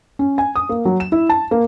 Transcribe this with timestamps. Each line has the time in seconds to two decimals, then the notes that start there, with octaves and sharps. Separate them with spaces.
0.19 C#4
0.38 G#5
0.56 D#6
0.69 A#3
0.85 F#3
1.00 E7
1.12 E4
1.29 A5
1.51 A#3